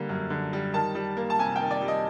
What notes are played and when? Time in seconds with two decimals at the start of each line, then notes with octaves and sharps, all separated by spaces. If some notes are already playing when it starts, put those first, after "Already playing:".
Already playing: D3 G3 A#3
0.09 F#2
0.30 D3
0.53 G3
0.73 D#3 A5
0.95 G3
1.17 A#3
1.30 A5
1.39 C3 G#5
1.56 D#3 G5
1.71 D5
1.81 G3
1.88 D#5